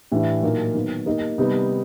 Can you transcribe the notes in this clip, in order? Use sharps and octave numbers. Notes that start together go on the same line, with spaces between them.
A2 E3 A3 D4 G4
A#2 F#3 A#3 D#4
D#3 F#3 B3
A#3 D#4 G4 A#4 D#5
C3 D#3 G3 B3 D#4